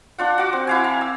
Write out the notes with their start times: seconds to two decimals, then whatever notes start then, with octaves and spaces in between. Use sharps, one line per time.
0.18 D4 F4 F#5
0.38 F#4 D6
0.53 C4
0.67 E4 F5 G#5
0.84 F5 A#5
1.01 E6